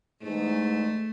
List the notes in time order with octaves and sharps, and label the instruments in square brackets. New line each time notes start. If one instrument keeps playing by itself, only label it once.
[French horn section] E2 G#2 [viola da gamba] A3